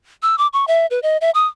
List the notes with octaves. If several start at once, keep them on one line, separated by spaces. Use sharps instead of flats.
E6
D6
C#6
E5
B4
D#5
E5
D#6